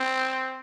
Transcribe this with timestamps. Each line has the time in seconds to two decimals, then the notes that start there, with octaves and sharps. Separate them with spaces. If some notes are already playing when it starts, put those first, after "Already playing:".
Already playing: C4